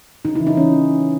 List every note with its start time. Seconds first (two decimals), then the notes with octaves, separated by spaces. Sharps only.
0.25 C#3 D#4
0.35 E3 E4
0.47 D#4
0.54 E3 C#4